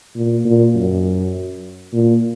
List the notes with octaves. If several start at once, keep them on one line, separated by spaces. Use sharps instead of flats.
A#2
A#2
F#2
A#2